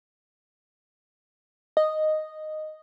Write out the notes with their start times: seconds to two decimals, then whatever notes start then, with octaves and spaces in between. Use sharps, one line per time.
1.77 D#5